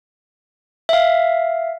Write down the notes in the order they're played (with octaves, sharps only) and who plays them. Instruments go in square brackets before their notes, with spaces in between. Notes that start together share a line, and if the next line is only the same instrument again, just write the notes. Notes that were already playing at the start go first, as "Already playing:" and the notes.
[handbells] E5 F5